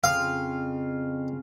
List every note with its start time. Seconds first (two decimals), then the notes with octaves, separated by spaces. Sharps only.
0.04 F2 C#3 F4 F5